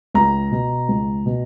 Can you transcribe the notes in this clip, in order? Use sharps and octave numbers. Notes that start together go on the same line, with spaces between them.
C#2 A#5
B2
C#2
B2